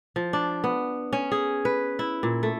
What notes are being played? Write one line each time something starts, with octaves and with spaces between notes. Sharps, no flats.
F3
D4
B3
C#4
G#4
B4
E4
A#2
A3